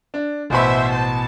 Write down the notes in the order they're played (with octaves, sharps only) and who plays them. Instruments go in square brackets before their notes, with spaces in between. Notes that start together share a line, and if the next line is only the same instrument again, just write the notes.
[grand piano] D4
[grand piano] A1 B2 B5 [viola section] C5 E5
[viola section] A5